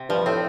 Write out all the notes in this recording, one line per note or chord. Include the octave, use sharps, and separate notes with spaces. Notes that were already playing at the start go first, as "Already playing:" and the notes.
Already playing: C3
G2 F3
A2 C4